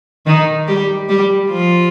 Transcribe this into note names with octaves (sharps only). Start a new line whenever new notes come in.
D#3 D#4
G3 G4
G3 G4
F3 F4